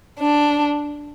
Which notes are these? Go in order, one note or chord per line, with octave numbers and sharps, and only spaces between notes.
D4